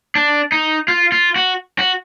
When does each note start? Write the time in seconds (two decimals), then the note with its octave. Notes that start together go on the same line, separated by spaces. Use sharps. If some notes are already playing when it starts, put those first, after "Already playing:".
0.15 D4
0.52 D#4
0.88 F4
1.12 F4
1.36 F#4
1.79 F#4